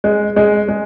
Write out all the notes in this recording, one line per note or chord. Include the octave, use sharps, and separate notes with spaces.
G#3
G#3
G#3